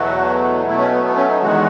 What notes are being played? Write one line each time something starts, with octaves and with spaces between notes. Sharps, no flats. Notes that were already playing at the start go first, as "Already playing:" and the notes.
Already playing: E2 B2 F#3 A3 F#4
B2 F#3 A3 E4
C#4
B3
B3
C#4
D#4
E2 D#3 G#3 F#4